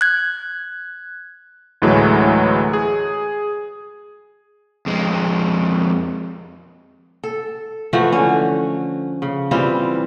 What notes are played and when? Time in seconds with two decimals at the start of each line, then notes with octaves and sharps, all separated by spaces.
0.01 F#6 G#6
1.82 D2 A2 E3 F#3 G#3 A3
2.73 G#4
4.86 F2 G#3
7.24 A4
7.93 E3 F3 A3 F#4
8.12 D3 C#4
9.22 C#3
9.51 E3 G3 C4 F4